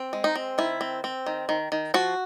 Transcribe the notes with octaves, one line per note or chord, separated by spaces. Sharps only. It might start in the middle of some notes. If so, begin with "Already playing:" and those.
Already playing: C4
G#3
D#4
C4
D#3 E4
C4
C4
D#3
D#3
D#3
F3 F#4